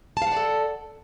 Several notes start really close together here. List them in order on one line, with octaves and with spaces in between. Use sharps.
A5 F5 F#5 D5 A4